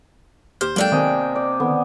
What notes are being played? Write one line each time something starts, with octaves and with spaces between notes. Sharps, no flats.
D#2 G4 C5 F6
F#3 G#3 A#3 D4 A4 G5
C3 D#3 D#5 G#5
D5
D3 D#3 B3